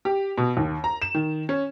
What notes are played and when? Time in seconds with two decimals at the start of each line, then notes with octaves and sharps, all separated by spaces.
0.05 G4
0.38 B2
0.57 D#2
0.84 A#5
1.02 E7
1.14 D#3
1.49 C#4